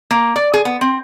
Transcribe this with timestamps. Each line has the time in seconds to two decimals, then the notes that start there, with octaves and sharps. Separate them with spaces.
0.11 A#3
0.36 D5
0.54 G#4
0.65 B3
0.81 C4